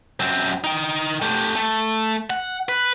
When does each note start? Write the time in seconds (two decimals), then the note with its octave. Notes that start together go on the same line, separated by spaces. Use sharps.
0.20 F#2 C4
0.64 D#4 G5
1.22 A3 G4
1.56 A3
2.30 F#5
2.69 B4